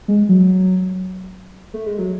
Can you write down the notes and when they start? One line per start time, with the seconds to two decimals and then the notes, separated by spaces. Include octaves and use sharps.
0.08 G#3
0.29 F#3
1.74 A3
1.86 G#3
1.99 F#3